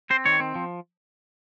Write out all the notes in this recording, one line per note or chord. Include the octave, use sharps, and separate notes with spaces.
C4 C5
D#3 C#5
C4
F3